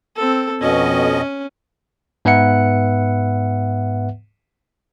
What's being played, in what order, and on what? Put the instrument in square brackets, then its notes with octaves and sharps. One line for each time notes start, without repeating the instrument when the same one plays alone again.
[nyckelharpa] C4 A4
[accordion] F2 B2 D#5 [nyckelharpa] C#4
[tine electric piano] G#2 B3 B4 E5 F#5 C#7